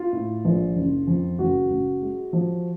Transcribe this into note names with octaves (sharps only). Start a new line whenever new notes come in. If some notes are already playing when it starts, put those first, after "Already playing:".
Already playing: F4
A2
A#1
F#1
F2
F#1 F#4
F#1
G#3
F3